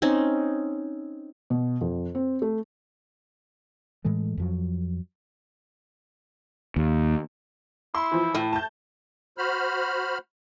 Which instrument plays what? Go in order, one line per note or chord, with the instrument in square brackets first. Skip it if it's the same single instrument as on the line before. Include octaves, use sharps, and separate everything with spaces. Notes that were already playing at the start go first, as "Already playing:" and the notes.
[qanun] C4 C#4 D#4
[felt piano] B2
F2
C4
A3
[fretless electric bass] A2 E3 G#3 A3
F2 F3 F#3
[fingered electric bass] D#2
[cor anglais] E4 [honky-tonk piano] C6
[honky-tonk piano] E3 F3
[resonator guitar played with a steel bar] A2
[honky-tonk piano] A5 G6
[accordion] F#4 C5 B5 F6